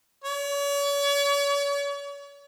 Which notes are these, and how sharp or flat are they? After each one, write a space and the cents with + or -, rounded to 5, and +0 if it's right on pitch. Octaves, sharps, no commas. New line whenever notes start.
C#5 +40